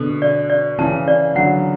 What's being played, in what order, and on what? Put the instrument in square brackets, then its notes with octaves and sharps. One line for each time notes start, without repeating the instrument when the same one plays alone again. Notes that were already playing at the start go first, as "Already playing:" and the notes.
Already playing: [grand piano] B2 D3 [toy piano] A4
[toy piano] D5
D5
[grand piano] C#3 E3 [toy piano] A5
[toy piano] D5
[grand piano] D3 F#3 [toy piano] F#5